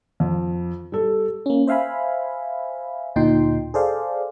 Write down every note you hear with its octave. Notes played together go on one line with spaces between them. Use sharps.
F2
G3 A4
A#3 C#4
C5 E5 F5 G#5 B5
D2 A#2 D#4 G5 C6
G#4 A4 C5 D5 F5